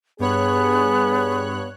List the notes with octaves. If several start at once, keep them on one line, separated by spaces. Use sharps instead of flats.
G2 B3 G#4 C#5 F#6